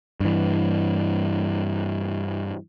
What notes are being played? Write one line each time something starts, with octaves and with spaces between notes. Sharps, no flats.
G2 E3